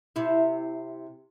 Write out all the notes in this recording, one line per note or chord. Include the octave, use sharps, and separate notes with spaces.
C3 E4